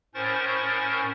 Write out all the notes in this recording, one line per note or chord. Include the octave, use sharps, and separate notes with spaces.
A2 C#4 A#4 C5 C#6 A6